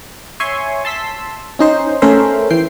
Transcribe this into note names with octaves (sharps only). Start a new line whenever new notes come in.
C#5 E5 G#5 C6 C#6
A5 C6 E6 B6
C#4 D#4 C5
A3 C#4 G#4 A#4 C5 E5
E3 G5 C7